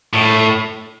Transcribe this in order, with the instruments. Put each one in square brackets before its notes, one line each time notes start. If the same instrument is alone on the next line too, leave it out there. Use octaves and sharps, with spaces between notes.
[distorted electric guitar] A2